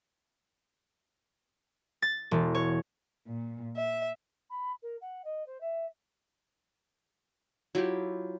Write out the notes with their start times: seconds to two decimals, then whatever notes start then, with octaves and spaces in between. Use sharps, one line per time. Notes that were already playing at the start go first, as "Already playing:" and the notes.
2.02 A6
2.31 E1
2.55 C#5
3.26 A#2
3.76 E5
4.49 B5
4.82 A#4
5.01 F#5
5.24 D#5
5.46 C5
5.60 E5
7.75 F#3 E4 F4 G4